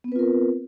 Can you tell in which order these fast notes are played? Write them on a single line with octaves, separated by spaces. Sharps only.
B3 C4 B4 F4 A#4